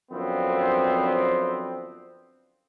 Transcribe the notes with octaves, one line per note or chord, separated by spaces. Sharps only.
F#2 D3 F3 B3 C4